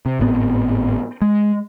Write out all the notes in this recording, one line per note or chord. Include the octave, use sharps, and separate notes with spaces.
C3
G#1 A2 B3 C4
G#3